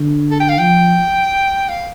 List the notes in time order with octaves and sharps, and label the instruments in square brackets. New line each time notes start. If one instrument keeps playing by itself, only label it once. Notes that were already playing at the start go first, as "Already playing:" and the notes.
Already playing: [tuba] D3
[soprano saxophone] A4
G5
F5
[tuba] F3 [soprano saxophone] G5
[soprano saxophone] F5